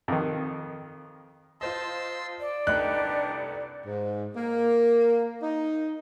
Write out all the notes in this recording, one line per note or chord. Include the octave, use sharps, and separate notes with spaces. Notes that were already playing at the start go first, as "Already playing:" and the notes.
F2 D#3
F4 C5 D#5 A5 C6 E6
D5
C2 A3 D4 D#4 G4 B4 F#6
G#2
A#3
D#4